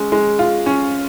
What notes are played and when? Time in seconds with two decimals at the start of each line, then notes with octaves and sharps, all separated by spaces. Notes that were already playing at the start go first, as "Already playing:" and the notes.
Already playing: G#3 C#4
0.12 G#3
0.39 F4
0.66 C#4